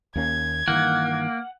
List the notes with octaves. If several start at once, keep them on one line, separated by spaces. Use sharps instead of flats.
D#2 A#3 C#4 G#6
G2 D#3 E3 A#3 F#5